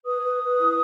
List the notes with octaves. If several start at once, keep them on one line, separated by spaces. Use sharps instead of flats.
B4 D#6
B4
B4
E4